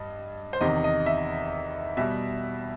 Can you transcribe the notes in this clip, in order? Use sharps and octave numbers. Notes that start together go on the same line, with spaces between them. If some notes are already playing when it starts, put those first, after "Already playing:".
Already playing: G2 D#5
C5
E2 C3 D#3 D#5
D#5
E5
B2 G3 E5